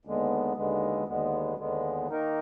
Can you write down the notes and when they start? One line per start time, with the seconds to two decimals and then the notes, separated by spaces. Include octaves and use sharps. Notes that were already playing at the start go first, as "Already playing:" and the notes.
0.05 D#2 D3 G#3 B3
0.56 D#2 D3 G#3 B3
1.06 D#2 D3 G#3 B3
1.57 D#2 D3 G#3 B3
2.08 D#3 A#3 D#4 A#4